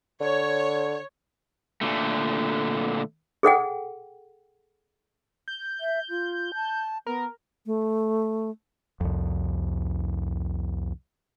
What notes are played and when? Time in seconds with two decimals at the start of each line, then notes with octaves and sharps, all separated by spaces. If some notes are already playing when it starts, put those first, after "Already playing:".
0.20 D3 C#5
1.81 A#2 D3 A3
3.43 G#4 A4 F#5 G5
5.48 G6
5.80 E5
6.10 F4
6.55 A5
7.07 B3 A#4
7.66 A3
9.01 C2 F2